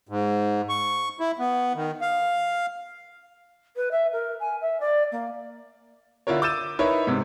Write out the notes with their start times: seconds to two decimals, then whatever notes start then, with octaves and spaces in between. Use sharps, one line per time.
0.09 G#2
0.69 C#6
1.20 E4
1.39 B3
1.75 D#3
2.01 F5
3.76 B4
3.91 E5
4.12 A#4
4.40 G#5
4.61 E5
4.80 D5
5.12 A#3
6.27 D3 E4 F4 A#4 C#5
6.42 D6 E6 G6 A6 D#7 E7
6.79 D#4 E4 A#4 B4 C#5
7.07 G#2 C3